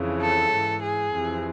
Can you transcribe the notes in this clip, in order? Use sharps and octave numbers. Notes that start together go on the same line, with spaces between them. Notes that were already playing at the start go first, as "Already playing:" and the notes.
Already playing: F2 C#3 E3
A4
G#2 E3
G#4
F2 C3 E3